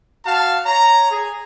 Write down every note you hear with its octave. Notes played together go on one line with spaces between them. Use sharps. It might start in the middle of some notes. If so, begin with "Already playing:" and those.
F#4 F5 A5
C#5 A#5
G#4